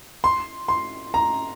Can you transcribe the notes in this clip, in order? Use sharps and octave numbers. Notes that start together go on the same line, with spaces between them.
C6
C6
A#5